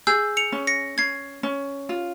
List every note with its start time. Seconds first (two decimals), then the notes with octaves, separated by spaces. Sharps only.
0.07 G#4 E6 G6
0.37 C#7 F7
0.52 C#4
0.67 A#6 C#7
0.98 C#4 G#6 C7
1.43 C#4
1.89 F4